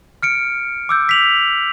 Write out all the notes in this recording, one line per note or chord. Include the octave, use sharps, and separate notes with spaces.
F6 C#7 D7
D6 E6 G6
B6 F7 F#7